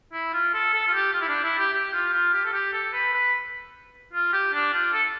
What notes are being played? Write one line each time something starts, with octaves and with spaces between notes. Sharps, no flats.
E4
F4
A4
A4
F4
G4
F4
E4
D4
E4
G4
G4
F4
F4
G4
A4
G4
A4
B4
B4
F4
G4
D4
F4
A4